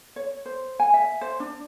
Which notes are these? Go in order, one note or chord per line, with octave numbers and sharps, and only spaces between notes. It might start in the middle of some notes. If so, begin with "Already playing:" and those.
C#5
C5
G#5
E5
C5
D4